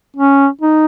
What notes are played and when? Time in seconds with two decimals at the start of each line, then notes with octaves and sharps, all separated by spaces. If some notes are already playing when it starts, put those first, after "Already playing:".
0.16 C#4
0.61 D#4